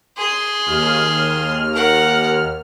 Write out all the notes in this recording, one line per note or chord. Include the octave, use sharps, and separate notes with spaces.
G#4 C6
D#2 F6
A#4 F#5